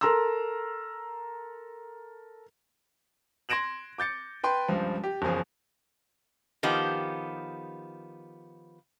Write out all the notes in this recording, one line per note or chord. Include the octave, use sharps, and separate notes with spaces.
A4 A#4 A#5 C6 E6
C6 G#6 A#6 D7 E7 F#7
D6 G6 A6 C#7
B4 G5 C6
C#2 G2 F3
G4
F#1 E2 F3 G#4
D#3 F3 B3 G4